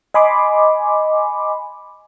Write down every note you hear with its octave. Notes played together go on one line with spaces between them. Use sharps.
D#5 G#5 B5 C6 D6